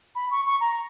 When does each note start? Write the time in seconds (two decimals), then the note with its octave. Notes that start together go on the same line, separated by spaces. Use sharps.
0.15 B5
0.31 C#6
0.45 C#6
0.60 A#5